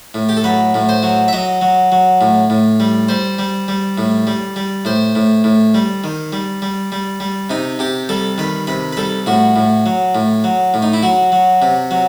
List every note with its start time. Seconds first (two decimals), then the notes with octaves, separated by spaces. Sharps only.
0.14 A2
0.29 G4
0.37 A4
0.44 F#3 B4
0.74 A2
0.89 C5
1.03 F#3
1.28 E5
1.33 F#3 D#5
1.61 F#3
1.92 F#3
2.21 A2
2.50 A2
2.80 G3
3.09 G3 C5
3.39 G3
3.68 G3
3.98 A2
4.27 G3
4.56 G3
4.85 A2 C5
5.15 A2
5.44 A2
5.74 G3
6.04 D#3
6.32 G3
6.62 G3
6.92 G3
7.20 G3
7.50 C3 D#4
7.79 C3 G4
8.09 G3 A4
8.38 D#3 B4
8.67 C3 B4
8.93 B4
8.97 G3 A4
9.26 A2 F#4
9.56 A2
9.86 F#3
10.15 A2
10.44 F#3
10.74 A2
10.82 D#4
10.93 E4
11.03 F#3 F#4
11.32 F#3
11.62 C3
11.91 F#3